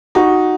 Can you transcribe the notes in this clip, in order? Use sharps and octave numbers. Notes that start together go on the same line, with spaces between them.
D#4 F#4